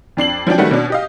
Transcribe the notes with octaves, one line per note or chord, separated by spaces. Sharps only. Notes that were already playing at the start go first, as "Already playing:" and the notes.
F2 D4 C7 F#7
F3 F#3 C#4 D4 G5
D#3 G3 A3 C#4 F#4 B4
B2 C#4 D4
G4 D#5 F5